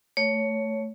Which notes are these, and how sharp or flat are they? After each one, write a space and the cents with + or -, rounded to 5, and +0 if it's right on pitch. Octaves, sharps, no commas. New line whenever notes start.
A3 +0 C#5 +10